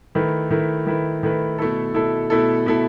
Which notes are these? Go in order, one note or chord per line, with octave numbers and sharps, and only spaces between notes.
D#3 A3 E4 B4
D#3 A3 E4 B4
D#3 A3 E4 B4
D#3 A3 E4 B4
B2 A3 E4 A4
B2 A3 E4 A4
B2 A3 E4 A4
B2 A3 E4 A4